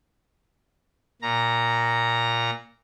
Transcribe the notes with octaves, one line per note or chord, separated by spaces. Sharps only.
A#2 A#5